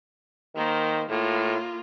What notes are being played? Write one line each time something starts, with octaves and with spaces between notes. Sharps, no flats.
D#3 A#3 C5
A2 A#3 F4